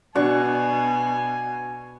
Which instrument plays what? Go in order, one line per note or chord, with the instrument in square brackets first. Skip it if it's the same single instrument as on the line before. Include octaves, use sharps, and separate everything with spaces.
[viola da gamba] B2 [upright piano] D4 [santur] F#4 C#6 [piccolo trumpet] G#5